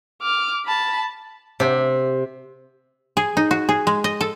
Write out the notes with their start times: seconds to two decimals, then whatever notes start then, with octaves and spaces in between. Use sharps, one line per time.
0.22 D6 F6
0.66 A5 B5
1.60 C3
3.17 G#4
3.37 D#4
3.51 F#4
3.69 G#4
3.87 G#3
4.04 D#5
4.21 A4